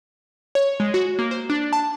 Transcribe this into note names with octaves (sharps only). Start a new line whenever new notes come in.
C#5
G#3
F#4
A#3
C5
D4
A5